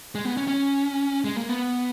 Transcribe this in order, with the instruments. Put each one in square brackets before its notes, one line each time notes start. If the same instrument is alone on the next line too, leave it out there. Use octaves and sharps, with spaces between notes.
[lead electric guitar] G#3
B3
C#4
C#4
G#3
A#3
B3